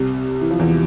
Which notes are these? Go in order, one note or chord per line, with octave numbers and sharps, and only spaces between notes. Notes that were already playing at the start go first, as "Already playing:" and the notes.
Already playing: C2 C3
E3
F3
E2 E3